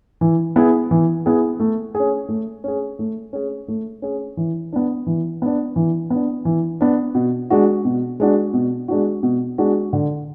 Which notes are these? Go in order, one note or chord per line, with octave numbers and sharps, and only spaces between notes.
E3
B3 E4 G#4
E3
B3 E4 G#4
A3
G#4
C#4
A3
C#4 G#4
A3
C#4 G#4
A3
C#4 G#4
E3
B3 D4
E3
B3 D4
E3
B3 D4
E3
B3 D4
B2
G#3 D4 F#4
B2
G#3 D4 F#4
B2
G#3 D4 F#4
B2
G#3 D4 F#4
D3